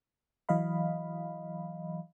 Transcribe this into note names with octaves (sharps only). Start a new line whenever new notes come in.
E3 F#3 D#5 F5 B5